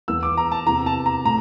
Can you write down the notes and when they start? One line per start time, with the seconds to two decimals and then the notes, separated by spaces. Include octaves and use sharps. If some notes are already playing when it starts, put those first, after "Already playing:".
0.08 E2 E3 E6
0.23 D6
0.37 A#5
0.52 A5
0.66 E2 C3 E3 A#5
0.86 A5
1.06 A#5
1.25 A2 A#5